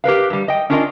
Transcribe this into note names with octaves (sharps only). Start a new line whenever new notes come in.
G4 A#4 B4 F5
G2 G3
D#5 G5
C#4 D4 F4 A#4 C#5 D#5